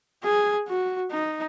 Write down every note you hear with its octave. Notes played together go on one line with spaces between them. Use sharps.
G#4
F#4
D#4